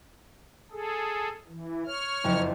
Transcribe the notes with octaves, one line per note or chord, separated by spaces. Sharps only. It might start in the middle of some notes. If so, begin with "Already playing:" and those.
G#4 A4
E3
C#5 F6
F#1 F2